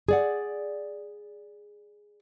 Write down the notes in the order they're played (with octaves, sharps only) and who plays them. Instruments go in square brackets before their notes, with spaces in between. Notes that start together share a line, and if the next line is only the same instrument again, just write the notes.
[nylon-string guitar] G#4 D5 F#5